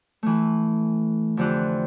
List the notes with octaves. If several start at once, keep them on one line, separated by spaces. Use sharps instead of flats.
E3 A3
F2 D3 E3 G4 C5 F#6